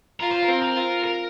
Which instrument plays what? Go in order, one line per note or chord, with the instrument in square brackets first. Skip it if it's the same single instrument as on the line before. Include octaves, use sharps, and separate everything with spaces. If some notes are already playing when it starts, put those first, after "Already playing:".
[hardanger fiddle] F4 [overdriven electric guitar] A#4
[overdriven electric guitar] C5
A#4
[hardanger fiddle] C4
[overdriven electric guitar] A#4
[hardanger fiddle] F4
[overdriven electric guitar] A#4